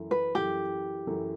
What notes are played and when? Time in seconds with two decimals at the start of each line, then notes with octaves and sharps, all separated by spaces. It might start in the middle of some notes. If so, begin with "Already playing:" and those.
Already playing: F#2 E3 A3 E4
0.11 B4
0.35 F#2 E3 A3 E4 G4
1.07 F#2 E3 A3 E4